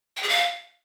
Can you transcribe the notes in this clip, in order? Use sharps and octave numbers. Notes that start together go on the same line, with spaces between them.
G5
G#4
F5